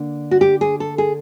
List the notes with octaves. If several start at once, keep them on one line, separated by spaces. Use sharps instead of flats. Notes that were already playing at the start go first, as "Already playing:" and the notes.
Already playing: D3 A#3
F#4
G4
G#4
A4
G#4